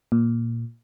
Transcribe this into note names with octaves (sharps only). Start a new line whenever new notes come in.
A#2